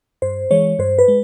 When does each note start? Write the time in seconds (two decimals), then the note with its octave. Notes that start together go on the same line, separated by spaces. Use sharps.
0.22 G2 C5
0.51 E3 G#3 C#5
0.79 G2 C5
0.98 B4
1.08 G#3